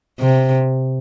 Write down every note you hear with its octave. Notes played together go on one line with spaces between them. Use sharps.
C3